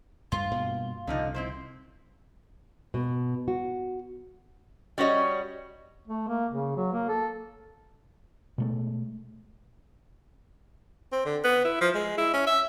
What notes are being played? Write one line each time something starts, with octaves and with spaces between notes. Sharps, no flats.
G2 F4
G2 B2 A#3
C2 D3 F3 D#4
C4 E4 C5
B2
F#4
G3 C#4 F#4 C#5 D#5
A3
A#3
C#3
F#3
A#3
A4
B2 G#3 A3
C4
D3
B3
E4
F3
G#3
E4
C#4
E5